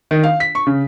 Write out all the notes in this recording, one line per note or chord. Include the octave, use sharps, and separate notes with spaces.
D#3
F5
B6
C#6
C#3